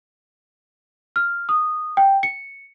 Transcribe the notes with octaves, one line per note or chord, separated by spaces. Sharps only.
F6
D#6
G5
C#7